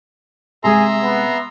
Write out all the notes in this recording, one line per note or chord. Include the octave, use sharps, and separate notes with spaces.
C3 G#3 G#4 E5 A#5 C6
B3